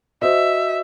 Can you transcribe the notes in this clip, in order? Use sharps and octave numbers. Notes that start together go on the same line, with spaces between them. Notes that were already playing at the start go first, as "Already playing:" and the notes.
F#4 C5 D#5 E5